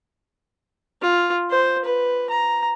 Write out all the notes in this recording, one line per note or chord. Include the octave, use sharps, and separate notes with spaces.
F4
C5
B4
A#5